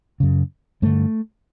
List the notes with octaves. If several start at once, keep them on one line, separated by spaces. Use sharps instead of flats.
F#2 C#3
G2 D3 A3